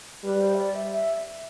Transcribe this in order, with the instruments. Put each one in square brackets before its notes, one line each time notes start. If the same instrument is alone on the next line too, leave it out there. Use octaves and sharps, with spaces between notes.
[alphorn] G3 [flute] B4
[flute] C5
E5
D5
E5
E5